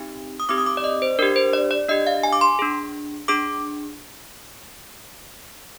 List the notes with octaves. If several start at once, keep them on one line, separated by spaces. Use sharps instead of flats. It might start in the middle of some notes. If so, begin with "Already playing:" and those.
Already playing: C4 D#4 G4
D#6
C4 D#4 G4 D6
D#6
D6
D5
D#5
C5
D4 G4 A#4
C5
D5
D5
D4 G4 D#5
F5
G#5
D6
C6
D4 G#4
D4 G#4 D6